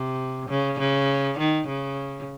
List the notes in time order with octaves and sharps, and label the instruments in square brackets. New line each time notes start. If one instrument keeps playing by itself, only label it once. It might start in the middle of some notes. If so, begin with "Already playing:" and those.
Already playing: [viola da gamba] C3
C#3
C#3
D#3
C#3